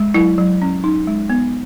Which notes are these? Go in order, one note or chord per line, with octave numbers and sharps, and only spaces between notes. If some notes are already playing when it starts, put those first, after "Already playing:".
Already playing: G#3
F#3 E4
F#3
C#4
D#4
G#3
B3